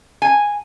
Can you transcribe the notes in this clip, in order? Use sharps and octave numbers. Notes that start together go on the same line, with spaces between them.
G#5